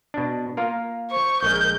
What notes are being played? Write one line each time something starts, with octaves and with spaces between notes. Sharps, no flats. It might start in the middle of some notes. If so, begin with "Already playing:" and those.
B2 D4
A#3 F4 A#4
C5 C#6
A#1 G#3 A#4 G6